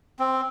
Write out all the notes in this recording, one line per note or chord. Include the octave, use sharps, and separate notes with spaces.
C4